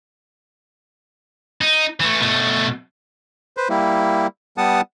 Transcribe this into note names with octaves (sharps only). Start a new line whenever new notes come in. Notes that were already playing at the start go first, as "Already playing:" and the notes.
D#4
E3 A3
B2 A3
B4 C5
G3 A#3 E4
G3 B3 F#5 A5 D#6